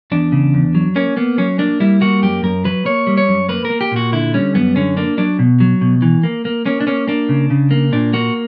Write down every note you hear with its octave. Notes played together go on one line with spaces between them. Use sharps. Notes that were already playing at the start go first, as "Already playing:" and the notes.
E2 D4
C#3
E2
F#3
A#3 C#4
A#3 B3
F#3 C#4
A#3 D4
G3 E4
A#3 F#4
F#2 G4
F#2 A#4
F#3 B4
A#3 C#5
G3
C#5
F#2
A#3 B4
A#4
A#3
G4
A#2 F#4
D3 E4
G3 C#4
F#2 B3
D3 C#4
A#3 D4
F#3 D4
B2
F#3
B2
E3
A#3
A#3
A#3 C#4
D4
A#3 C#4
A#3 D4
C#3
C#3
A#3
A#2 D4
A#3 F#4